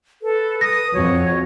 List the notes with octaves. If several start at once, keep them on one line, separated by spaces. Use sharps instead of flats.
A4 B4
D#6 A#6
F2 F#4 C#5